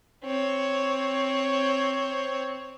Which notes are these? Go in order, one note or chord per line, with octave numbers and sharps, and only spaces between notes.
C4 C#5